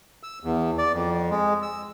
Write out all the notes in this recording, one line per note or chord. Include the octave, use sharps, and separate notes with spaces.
E6
E2
D5
F2
G#3
E6